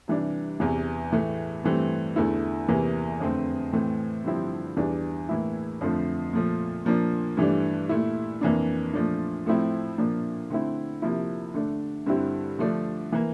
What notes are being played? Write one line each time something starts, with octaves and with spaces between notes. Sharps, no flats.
C3 E3 G3 D4
E2 C3 E3
A2 E3 A3
G2 E3 A3 C4
E2 D3 A3 E4
E2 C3 E3 A#3
F2 D3 A3 C4
A2 E3 A3 C4
G2 D3 F3 C4 E4
E2 E3 G3 D4
A2 E3 A#3 E4
F2 D3 F3 A3
A#2 F3 A3
A#2 F3 A#3 D4
G2 E3 A3 D4
A#2 A3 E4
F2 E3 A#3 D4
A#2 F3 A3 D4
A2 F3 A3 C4 E4
A#2 F3 A#3 D4
D3 A3 C4 E4
C3 F3 A#3 E4
D3 A3 D4
G2 D3 G3 C4 E4
D3 F3 A3 D4
E3 A#3